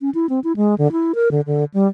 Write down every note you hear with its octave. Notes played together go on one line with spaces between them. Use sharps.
C#4
E4
C4
E4
G#3
D3
E4
A#4
D3
D3
G3